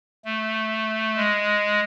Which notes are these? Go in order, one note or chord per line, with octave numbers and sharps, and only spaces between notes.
A3
G#3